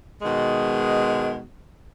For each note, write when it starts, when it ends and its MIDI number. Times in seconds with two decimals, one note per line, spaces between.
0.22 1.41 47
0.22 1.41 51
0.22 1.41 56